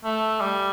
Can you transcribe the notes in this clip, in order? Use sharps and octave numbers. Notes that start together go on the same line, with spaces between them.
A3
G3